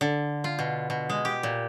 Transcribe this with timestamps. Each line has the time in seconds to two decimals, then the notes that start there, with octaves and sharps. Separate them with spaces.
0.01 D3
0.44 F4
0.59 B2
0.90 B2
1.09 G#3
1.25 G4
1.43 A#2